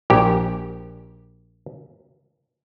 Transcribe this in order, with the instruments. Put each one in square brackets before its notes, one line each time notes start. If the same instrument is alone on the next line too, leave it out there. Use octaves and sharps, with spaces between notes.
[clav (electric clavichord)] A#1 G4